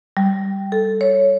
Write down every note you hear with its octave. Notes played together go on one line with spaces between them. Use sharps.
G3
A4
C#5